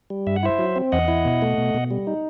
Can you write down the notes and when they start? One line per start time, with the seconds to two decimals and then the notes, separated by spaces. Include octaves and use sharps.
0.10 G3
0.27 G2 E5
0.36 F#5
0.43 E4 C5 E5
0.59 F#3
0.76 C4
0.92 E2 D#5 F#5
1.08 E4
1.25 B2
1.42 A3
1.58 B2
1.74 B2
1.91 G3
2.07 D#4